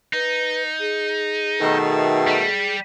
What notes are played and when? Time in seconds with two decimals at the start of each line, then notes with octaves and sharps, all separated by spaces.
0.13 D#4 B4
0.80 G#4
1.60 B2 D#3 A3
2.27 G3